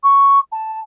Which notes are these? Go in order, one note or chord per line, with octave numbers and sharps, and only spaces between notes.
C#6
A5